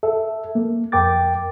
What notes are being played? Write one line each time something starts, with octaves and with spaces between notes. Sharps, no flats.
A4 E5
A#3
F2 A#4 G5 D6 A6